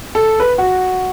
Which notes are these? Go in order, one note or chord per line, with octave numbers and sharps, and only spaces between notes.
A4
B4
F#4